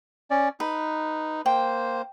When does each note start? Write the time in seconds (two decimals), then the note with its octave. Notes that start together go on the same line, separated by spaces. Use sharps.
0.31 C#4 D5
0.60 D#4 B4
1.46 A#3 C5 G5